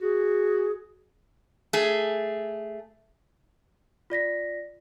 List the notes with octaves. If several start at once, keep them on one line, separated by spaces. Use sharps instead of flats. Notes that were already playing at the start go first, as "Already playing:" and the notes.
F#4 G#4
A3 G#4
F4 D5 A#6 B6